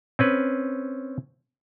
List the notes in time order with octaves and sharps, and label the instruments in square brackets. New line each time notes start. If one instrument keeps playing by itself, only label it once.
[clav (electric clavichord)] C4 C#4 B4